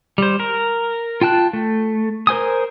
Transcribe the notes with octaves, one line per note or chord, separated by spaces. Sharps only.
G3 C5
A#4
F4 G5 A5 F#6
A3
A#4 C5 G#5 D#6